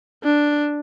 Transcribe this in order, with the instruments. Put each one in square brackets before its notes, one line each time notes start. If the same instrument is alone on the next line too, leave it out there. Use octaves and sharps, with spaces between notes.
[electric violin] D4